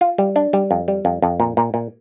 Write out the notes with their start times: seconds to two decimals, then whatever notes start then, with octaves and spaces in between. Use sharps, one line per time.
0.01 F4
0.18 G3
0.36 D4
0.53 G3
0.71 F2
0.88 G3
1.05 F2
1.22 F2
1.40 A#2
1.57 A#2
1.74 A#2